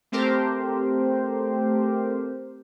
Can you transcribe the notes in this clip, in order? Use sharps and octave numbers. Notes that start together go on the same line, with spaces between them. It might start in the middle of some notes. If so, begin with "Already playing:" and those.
A3 C4 G4 A#4 C5